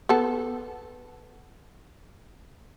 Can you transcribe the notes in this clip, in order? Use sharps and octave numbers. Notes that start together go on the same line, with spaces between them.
B3 A4